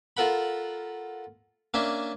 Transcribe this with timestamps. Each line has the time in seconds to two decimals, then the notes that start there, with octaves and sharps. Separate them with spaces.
0.17 F4 A4 A#4 F#5 B5
1.74 A#3 C#4 D4 E5